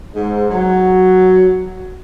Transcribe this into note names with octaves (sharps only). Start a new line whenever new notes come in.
G#2
F#3